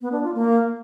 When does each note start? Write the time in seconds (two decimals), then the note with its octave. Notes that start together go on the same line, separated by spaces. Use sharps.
0.01 B3
0.12 D4
0.23 F4
0.34 A#3